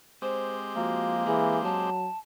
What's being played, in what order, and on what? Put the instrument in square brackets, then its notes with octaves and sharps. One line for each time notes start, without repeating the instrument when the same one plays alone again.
[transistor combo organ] G#3 C4 G4 [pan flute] C5
[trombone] F3 [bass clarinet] A#3 [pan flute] F#4
[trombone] E3 [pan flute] G#4
[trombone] F#3 [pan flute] A5